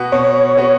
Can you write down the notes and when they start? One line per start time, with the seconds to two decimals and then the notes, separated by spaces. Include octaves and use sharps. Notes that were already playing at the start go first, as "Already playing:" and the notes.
Already playing: B2 B3 F#4
0.12 B2 C#5
0.57 B3 F#4